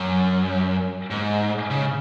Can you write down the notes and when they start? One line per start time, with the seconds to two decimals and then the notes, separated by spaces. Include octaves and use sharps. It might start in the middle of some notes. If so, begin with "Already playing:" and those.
Already playing: F#2
1.10 G#2
1.71 C#3